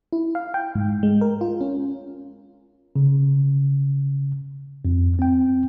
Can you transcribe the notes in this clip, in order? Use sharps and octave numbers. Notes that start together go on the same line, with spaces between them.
E4
F5
G5
G#2
G#3
A#4
F4
C#4
C#3
F2
C4 G5